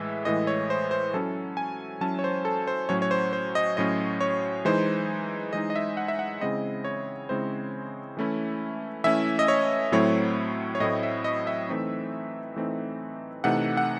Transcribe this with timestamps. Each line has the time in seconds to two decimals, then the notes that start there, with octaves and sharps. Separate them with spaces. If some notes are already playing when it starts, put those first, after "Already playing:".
Already playing: A2 E3 G#3 E5
0.25 A2 E3 G#3 D#5
0.47 C#5
0.70 C5
0.91 C5
1.14 F#3 C#4 E4 A4
1.57 G#5
2.01 F#3 C#4 E4 A5
2.19 C#5
2.24 C5
2.45 A4
2.67 C5
2.89 A2 F#3 C#4 C#5
3.02 C#5
3.11 C5
3.33 C5
3.55 D#5
3.77 A2 F#3 C#4 D#5
4.21 C#5
4.65 E3 G#3 D#4 C5
5.53 E3 G#3 D#4 D#5
5.70 D#5
5.76 E5
5.97 F#5
6.08 E5
6.19 F#5
6.41 C#3 G#3 C4 E4 D#5
6.84 C#5
7.29 C#3 G#3 C4 E4 C5
8.17 E3 A3 C#4 E4
9.04 E3 A3 C#4 E4 E5
9.39 D#5
9.48 C#5
9.92 A2 F#3 A3 C4 E4 C#5
10.75 C#5
10.80 A2 F#3 A3 C4 E4 D#5
11.03 E5
11.24 D#5
11.47 E5
11.69 E3 A3 C4 D#4
12.56 E3 A3 C4 D#4
13.44 C3 E3 A3 D#4 F#5
13.77 F#5